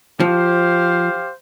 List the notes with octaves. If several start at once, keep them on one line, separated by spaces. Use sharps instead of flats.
F3 G4 C5 F5